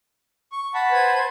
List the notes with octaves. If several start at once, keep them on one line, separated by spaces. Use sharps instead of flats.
C#6
F#5 A5 B5
B4 C5 G#6